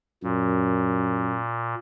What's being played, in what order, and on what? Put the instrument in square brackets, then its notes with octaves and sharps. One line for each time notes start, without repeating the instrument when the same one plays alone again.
[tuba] F#2 [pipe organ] A#2